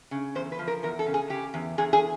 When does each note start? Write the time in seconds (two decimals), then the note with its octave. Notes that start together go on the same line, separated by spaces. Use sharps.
0.11 C#3
0.35 E2 C5
0.52 B4
0.59 F3
0.68 A#4
0.83 E2 A#4
0.99 A4
1.06 C#3
1.14 G#4
1.30 C#3 G4
1.54 E2
1.78 E2 G#4
1.93 G#4